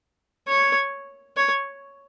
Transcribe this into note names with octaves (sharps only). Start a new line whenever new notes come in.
C#5
C#5